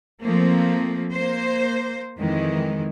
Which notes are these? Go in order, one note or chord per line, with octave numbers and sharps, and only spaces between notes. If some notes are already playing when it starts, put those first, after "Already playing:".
F3 A3 A#3 C4
A#3 C5
F2 D#3 E3 G#3